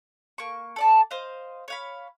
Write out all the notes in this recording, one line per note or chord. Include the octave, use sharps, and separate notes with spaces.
A#3 C#6
A4 D5 A5
C5 D#5 F5
C#5 F5 B5